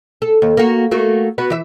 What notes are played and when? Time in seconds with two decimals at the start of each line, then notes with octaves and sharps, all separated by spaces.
0.22 A4
0.42 D#2
0.57 A#3 F#4
0.91 A3 A#3 F#4
1.38 B3 F#4 B4
1.50 E3 E5